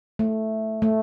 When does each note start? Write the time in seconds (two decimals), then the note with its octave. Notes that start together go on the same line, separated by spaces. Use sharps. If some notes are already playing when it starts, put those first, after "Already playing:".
0.19 A3
0.82 A3